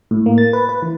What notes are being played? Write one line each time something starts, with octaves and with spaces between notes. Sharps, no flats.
A2
A#3
A6
B4
B4
E3